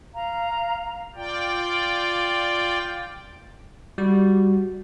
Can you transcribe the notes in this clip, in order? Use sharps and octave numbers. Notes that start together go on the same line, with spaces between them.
F5 A#5
F4 D5 G5
G3 F#4